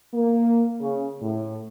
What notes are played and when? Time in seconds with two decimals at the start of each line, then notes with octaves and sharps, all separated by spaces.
0.14 A#3
0.80 C#3
1.22 A2